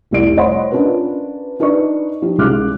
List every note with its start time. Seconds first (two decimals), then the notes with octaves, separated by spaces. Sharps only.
0.11 F1 C2 E4 D5 D7
0.37 C5 C#5 D#5 F#5 B5 C6
0.72 C#4 D4 F4 A#4 B4
1.60 D4 D#4 B4 D5 D#5 C#6
2.22 F3 D#4 G4
2.38 C2 C#3 G#3 D6 F6 F#6